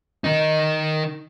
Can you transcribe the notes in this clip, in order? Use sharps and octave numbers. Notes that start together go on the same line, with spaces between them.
D#3 D#4